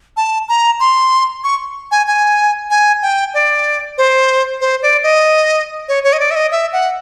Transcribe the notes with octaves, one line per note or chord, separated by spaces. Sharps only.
A5
A#5
C6
C#6
G#5
G#5
G#5
G5
D5
C5
C5
D5
D#5
C#5
C#5
D#5
D5
E5
D#5
E5
F#5